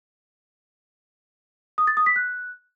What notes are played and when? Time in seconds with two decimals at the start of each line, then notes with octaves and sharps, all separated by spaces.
1.78 D#6
1.87 A6
1.97 D#6
2.06 B6
2.16 F#6